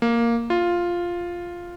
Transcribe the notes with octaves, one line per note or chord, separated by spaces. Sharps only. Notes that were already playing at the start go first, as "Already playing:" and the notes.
A#3
F4